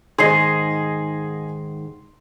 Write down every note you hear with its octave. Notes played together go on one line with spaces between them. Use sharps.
G#2 D#3 G#4 D#5 C6 C7